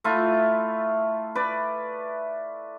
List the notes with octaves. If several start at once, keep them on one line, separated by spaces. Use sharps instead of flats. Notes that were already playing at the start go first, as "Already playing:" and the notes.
A3 E4 F4 E5
B4 D5